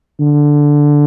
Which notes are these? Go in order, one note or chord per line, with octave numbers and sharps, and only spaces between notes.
D3